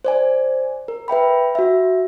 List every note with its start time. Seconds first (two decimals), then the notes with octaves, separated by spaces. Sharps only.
0.05 C5 D5 G#5
0.88 A#4
1.08 B4 E5 G5 B5
1.55 F#4 E5